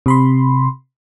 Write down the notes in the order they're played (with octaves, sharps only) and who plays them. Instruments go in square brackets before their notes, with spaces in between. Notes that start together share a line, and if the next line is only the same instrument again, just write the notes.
[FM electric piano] C3 B5 C6